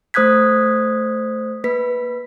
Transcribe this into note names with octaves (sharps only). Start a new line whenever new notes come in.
A3 C5 D#6 F#6 G#6 B6
A#3 B4 B6